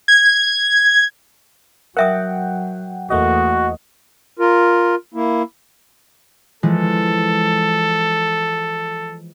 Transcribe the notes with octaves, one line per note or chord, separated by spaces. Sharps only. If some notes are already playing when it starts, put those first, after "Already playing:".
G#6
F#3 A#4 E5 F#5 G5 D#6
E2 A3 A#3 F#4 D#5
F4 A#4
A#3 E4
E3 F3 G#3 A4